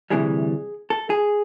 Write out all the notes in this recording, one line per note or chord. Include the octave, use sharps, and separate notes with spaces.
D2 C3 E3 G3 G#4
A4
G#4